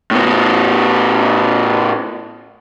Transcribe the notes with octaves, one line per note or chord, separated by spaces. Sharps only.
A2 B3